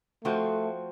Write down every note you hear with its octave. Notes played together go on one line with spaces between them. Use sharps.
F3 A3 C4 F#4